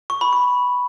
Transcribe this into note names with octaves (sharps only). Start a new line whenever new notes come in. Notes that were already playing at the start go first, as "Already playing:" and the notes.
C#6
B5
C#6